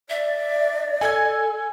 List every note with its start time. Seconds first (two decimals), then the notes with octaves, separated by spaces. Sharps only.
0.10 D5 E5
1.01 A4 G#5 G#6